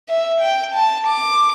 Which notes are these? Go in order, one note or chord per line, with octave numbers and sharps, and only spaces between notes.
E5
G5
A5
D6